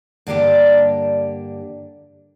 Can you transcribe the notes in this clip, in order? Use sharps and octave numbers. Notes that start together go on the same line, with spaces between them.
G2 D3 A#3 D4 G4